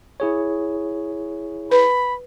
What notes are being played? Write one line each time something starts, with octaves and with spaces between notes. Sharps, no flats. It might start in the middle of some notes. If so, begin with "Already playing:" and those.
E4 G#4 C#5
B4 B5